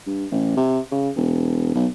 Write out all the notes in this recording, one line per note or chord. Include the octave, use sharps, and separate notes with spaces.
G2
A1
C3
C#3
E1
B1